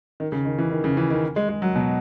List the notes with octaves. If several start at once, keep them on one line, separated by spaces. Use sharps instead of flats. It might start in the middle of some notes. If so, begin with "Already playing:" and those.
D#3
C#3
D#3
E3
D#3
C#3
E3
D#3
G#3
G#3
F#3
B2